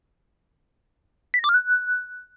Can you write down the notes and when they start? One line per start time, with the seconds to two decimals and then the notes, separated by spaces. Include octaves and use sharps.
1.34 B6
1.39 A#6
1.44 D6
1.49 F6
1.54 F#6